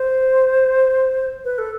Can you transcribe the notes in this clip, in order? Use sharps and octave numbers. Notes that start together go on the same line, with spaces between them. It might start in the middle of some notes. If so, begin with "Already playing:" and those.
Already playing: C5
B4
A4